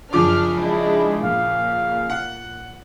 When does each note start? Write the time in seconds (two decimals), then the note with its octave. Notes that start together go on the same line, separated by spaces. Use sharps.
0.13 F#2 C#3 F3 D4 D6 F6
0.58 G#3 D4 E4
1.23 A#2 F5
2.10 F#5